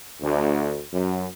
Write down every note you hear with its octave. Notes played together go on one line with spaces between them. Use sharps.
D2
F#2